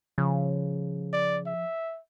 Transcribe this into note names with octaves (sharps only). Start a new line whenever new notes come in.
C#3 F3
D5
E5